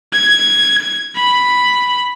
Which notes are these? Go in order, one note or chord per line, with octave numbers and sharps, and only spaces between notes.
G#6
B5